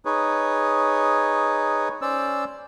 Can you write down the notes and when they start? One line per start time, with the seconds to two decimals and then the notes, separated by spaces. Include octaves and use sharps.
0.05 D#4 G#4 B4 C#5
2.02 C#4 C5 D5 E6